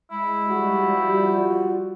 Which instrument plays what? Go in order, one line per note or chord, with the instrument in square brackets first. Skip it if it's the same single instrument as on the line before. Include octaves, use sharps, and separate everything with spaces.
[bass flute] G#3 [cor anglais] E4
[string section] F3 G3 [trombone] F#4
[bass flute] F4 [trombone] F#4